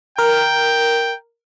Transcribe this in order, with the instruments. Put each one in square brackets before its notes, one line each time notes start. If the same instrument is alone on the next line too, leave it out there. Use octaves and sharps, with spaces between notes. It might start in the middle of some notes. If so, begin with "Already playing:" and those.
[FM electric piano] A#4 [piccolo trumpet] G5